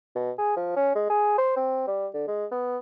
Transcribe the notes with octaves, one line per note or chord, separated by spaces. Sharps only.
B2
G#4
F3
C#4
G#3
G#4
C5
C4
G3
D3
G#3
B3